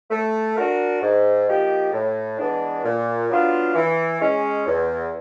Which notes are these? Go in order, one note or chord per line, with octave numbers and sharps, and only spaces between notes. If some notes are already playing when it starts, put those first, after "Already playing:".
A3
D4 F#4 A#4
G#2
F3 A#3 D#4 G4
A2
E3 G#3 B3 D4
A#2
F#3 B3 D4 F4
E3
G#3 C#4
E2